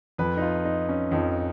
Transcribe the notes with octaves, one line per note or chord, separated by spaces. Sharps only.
F2 F3 B4
D#4
F4
D#4
C#4
F2 F3 D#4